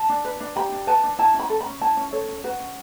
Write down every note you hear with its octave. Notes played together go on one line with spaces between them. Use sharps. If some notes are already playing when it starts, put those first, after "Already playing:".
Already playing: A5
D4
B4
D4
G4 B5
D4
B4 A5
D4
E4 A5
C#4
B5
A4
B5
C#4
E4 A5
C#4
A4 C#5
C#4
F#4 B4
C#4